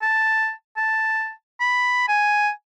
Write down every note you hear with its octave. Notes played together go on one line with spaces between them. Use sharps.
A5
A5
B5
G#5